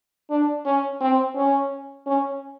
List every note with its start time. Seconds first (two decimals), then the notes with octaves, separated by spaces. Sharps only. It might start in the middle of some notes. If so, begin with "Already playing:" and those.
0.30 D4
0.65 C#4
1.01 C4
1.35 C#4
2.06 C#4